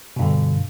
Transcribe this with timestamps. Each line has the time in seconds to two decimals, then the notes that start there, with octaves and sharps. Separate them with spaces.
0.16 B2
0.19 G2
0.22 D3